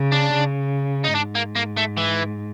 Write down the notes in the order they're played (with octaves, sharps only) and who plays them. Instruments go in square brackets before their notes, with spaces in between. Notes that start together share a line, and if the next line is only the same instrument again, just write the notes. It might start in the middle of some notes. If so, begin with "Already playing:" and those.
Already playing: [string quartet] C#3
[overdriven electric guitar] D4
[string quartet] C#3
[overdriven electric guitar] D#4
[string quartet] G#2 [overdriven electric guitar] D4
[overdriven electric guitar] A#3
A#3
A3
E3